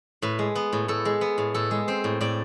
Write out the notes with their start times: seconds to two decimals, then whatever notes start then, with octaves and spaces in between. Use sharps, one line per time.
0.22 A2 B4
0.39 G#3
0.55 B3
0.73 A2
0.88 A2 A4
1.05 G#3
1.21 B3
1.38 A2
1.54 A2 A4
1.71 G#3
1.88 C4 C5
2.04 A2
2.21 A2 D5